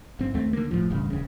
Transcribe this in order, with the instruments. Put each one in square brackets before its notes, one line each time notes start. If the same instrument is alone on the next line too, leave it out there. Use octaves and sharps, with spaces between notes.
[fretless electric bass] G1 C4
D#2 A3 C4
D3 A#3
E1 B1 A2 F3
E1 A1 G2 C#3
D#1 C#3